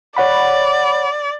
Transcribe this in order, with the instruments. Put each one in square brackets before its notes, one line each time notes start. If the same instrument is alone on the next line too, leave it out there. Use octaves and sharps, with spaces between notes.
[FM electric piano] C#5 F#5 B5 [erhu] D5